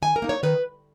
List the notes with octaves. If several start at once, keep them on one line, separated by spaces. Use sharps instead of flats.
D#3 G#5
A#4
A#3 D#4
C#5
D#3 B4